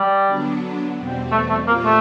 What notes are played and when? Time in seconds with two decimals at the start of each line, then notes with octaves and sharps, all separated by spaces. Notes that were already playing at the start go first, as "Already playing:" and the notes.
Already playing: G3
0.26 D3 F#3 B3 D4
0.97 E2 B2 G3 C4
1.32 A3
1.49 A3
1.67 A#2 G3 A#3 C4 F4
1.84 A3